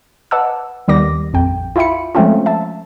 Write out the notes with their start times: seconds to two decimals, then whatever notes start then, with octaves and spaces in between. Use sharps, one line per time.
0.31 B4 D#5 F#5 A5 D6 E6
0.88 D#2 D#3 G3 B3 D6 A#6
1.33 A#1 F2 G5
1.76 E4 F4 E5 G5 B5 C#7
2.15 F3 G#3 A3 C4 C#4 F4
2.46 E5 A5